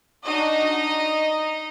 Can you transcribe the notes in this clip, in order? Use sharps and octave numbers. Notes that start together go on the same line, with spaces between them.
D4 D#4 F#4 D#5